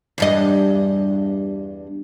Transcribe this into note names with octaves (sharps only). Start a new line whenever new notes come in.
E2 G2 D#5